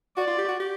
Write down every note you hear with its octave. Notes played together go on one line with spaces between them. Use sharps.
F#4 D5
F4
G4
F#4
G4